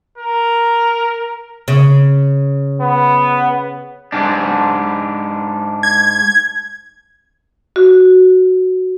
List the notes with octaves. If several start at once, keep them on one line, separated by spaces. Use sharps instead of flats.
A#4
C#3
B3
G#2 D4
G#6
F#4